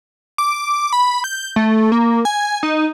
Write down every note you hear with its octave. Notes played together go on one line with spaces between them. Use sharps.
D6
B5
G6
A3
A#3
G#5
D#4